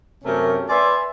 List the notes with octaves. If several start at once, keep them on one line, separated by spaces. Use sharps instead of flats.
F#2 C3 A3 C#4 A#4
B4 D5 E5 G#5 C6